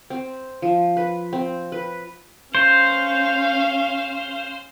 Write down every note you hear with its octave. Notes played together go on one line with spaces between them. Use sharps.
C4
F3
B4
C4
B4
C#4 C5 F5